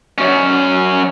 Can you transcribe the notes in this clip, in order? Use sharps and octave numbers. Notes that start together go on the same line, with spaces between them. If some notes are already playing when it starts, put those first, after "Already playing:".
F#2 C#4